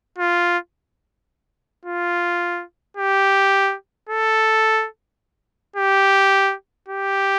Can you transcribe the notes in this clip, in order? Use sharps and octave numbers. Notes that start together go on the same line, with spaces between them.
F4
F4
G4
A4
G4
G4